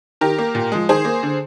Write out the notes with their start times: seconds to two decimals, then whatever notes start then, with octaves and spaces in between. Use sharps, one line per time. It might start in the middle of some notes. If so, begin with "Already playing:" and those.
0.21 D#3 G4 A#4
0.39 A#3
0.55 A#2
0.72 F3 G#3
0.89 D#3 G#4 C5
1.05 A#3
1.23 D3